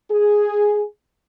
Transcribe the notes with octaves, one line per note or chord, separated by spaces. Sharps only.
G#4